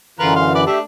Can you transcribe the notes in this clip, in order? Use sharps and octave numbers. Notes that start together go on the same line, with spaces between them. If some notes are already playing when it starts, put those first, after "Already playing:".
F#2 D3 E3 F4 A#4 B4
F5 C6
B4 D5
A3 D4 G4 E5